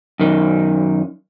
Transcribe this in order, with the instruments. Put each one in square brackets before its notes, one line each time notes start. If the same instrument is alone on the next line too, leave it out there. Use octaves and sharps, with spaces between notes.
[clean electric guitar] F#2 D#3